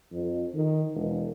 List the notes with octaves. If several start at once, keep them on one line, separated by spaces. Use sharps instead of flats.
F2
D#3
E1